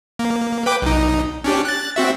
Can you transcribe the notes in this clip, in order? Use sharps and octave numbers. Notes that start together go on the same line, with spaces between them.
A#3
B4 G5 D6
B1 D#4
C#4 D4 G4
F#6 A6
C4 F#4 E5